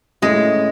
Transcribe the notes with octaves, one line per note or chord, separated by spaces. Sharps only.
A2 G#3 A3 C#4 E4